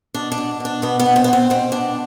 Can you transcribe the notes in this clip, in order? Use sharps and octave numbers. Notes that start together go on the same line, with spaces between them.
B2 D4
D4
B2
B2 D4
B2 B3
B3
B2
C4
B3
B2
C4
B2 C4
B2 D4